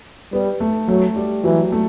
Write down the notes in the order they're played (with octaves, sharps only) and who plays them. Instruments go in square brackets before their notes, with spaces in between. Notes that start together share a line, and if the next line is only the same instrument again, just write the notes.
[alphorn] G3 [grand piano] B3
[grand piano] A3
[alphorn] F#3 [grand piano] A3
[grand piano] G3
[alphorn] E3 [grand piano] F#3
[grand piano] A3